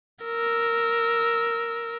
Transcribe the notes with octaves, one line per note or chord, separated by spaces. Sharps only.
A#4 E6